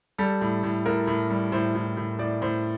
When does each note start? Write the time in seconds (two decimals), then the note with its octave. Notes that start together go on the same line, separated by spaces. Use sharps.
0.18 G3 A4
0.41 A2
0.63 A2
0.86 A2 A#4
1.07 A2
1.30 G3
1.52 A2 C5
1.75 A2
1.97 A2
2.19 A2 D5
2.42 A2 C5